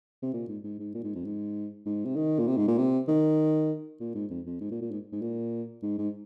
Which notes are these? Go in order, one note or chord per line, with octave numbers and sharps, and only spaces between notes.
C3
A#2
G#2
G#2
G#2
A#2
G#2
F2
G#2
G#2
C3
D#3
A#2
C3
G#2
A#2
C3
D#3
A#2
G#2
F2
F2
G#2
A#2
A#2
G#2
G#2
A#2
G#2
G#2